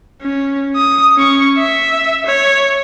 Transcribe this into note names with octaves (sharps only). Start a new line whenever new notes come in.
C#4
D#6
C#4 C#6
E5
C#5